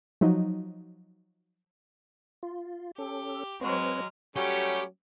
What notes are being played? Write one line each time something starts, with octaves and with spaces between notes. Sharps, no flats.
F3 F#3 D#4
F4
C#4 G4 A4
F#3 G#3 C4 B4 C#5 F6
F#3 G3 A3 C#4 G4